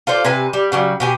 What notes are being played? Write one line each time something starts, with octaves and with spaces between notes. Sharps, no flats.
F4 A4 C5 D5
C3 B4 G#5
G3
C#3 F#3 G3
B2 G4 G#4